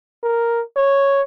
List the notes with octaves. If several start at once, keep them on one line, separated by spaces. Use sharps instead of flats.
A#4
C#5